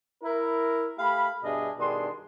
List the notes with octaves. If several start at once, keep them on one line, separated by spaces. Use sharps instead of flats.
E4 A#4
A3 G4 F5 B5
G2 B2 D4 G#4 D#5 E5
G2 B2 D#3 D4 G#4 C6